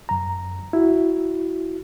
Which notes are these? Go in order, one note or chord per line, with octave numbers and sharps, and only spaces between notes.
F#2 A#5
E4 F#4